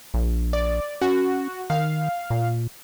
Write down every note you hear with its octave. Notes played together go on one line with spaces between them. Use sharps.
A#1
D5
C#4 F#4
D#3 F5
A#2